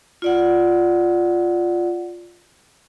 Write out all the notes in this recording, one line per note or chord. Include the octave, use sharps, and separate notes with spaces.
F4 D5 F#5